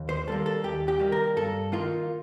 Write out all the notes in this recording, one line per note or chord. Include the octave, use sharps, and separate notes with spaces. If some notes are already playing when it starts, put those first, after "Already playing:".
Already playing: D#2
C5
D#3 G3 A#3 A4
A4
D#2 G4
G4
D#3 G3 A#3
A#4
G2 A4
D#3 A#3 F4